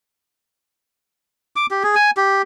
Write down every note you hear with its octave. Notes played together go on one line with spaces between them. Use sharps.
D6
G4
G#4
G#5
G4